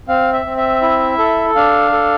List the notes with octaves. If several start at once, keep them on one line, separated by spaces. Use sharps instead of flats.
C4 F5
E5
C4
E5
E4
A4
D4 F5
A4